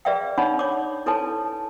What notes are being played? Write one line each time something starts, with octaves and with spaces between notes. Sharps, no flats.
G#4 B4 D5 E5 F5 G5
D4 D#4 C#5 F#5 B5
C#5 D6
E4 A4 B4 C#5 G#5 A5